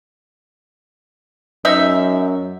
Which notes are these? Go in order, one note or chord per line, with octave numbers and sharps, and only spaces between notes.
F#2 D#4 E5